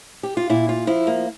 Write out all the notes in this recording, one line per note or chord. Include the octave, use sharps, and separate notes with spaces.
G4
F4
A#2 E4
F4
F3 E4
A#3